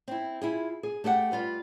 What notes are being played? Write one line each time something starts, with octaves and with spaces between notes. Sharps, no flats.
C4 E4
E4 F4 G#4
G#4
A3 G4 D5 F#5
G3 F4 B4